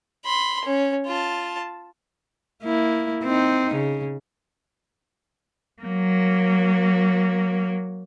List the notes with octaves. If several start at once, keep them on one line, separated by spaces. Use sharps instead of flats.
B5 C6
C#4
F4 A5
A#3 E4
C4 D#4
C#3
F#3 A#3